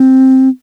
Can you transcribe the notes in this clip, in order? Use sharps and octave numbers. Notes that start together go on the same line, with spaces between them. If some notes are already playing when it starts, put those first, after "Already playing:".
Already playing: C4